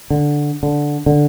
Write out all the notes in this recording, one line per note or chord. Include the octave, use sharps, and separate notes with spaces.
D3
D3
D3